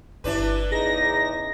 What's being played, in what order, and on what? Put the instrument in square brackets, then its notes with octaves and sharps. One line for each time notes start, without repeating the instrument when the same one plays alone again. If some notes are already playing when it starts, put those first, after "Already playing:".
[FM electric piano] G1 E4 [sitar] E3 D4 B4
[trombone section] E2 C#3 D#4 [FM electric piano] G#4 [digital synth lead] A#6